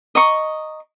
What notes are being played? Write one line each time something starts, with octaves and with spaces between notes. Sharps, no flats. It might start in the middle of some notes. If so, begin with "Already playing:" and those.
D#5 A#5 C#6